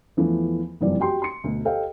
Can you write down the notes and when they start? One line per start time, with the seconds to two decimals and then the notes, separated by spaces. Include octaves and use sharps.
0.17 E2 E3 F3 A3 B3
0.81 F#1 G2 E3 F3 C4 D5
1.00 F#4 G4 G5 C6
1.22 C6 C#7
1.44 D2 B2
1.65 G4 A4 C5 D#5 F5 G5